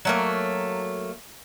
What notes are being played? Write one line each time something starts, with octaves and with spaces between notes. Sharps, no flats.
F#3 A3 A#3